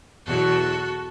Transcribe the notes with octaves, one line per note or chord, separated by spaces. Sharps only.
E2 B2 F#3 F#4 A4